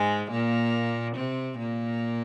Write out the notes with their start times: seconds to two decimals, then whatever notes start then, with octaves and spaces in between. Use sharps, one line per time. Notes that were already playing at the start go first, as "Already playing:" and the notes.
Already playing: G#2 G#3
0.30 A#2 A#3
1.15 C3 C4
1.58 A#2 A#3